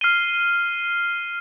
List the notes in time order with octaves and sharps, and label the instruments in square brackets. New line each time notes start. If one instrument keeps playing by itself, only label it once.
[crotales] F6 C7 D#7 G7